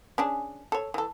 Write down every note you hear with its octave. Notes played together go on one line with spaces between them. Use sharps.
C#4 D4 G#4
A4 C#5
E3 A4